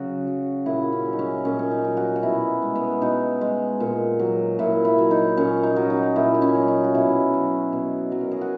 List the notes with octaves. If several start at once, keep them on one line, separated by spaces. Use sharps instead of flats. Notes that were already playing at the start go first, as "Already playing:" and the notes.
Already playing: C#3 F#3 F#4
F#3
A#2 E4
C#4
F#3
D#4
C#4
A#2 C#4
C#4
D#4
F#3
F#4
F#4
B2 E4
G#3
B3
B2 D#4
G#3
A#2
F#3
A#2 E4
E4
F#3
D#4
A#2 C#4
D#4
F#3
D#4
A#2 E4
D#4
C#4
F#3
D#4
F#4
B2 E4
F#3
B2
F#3
A#4
G#4
F#4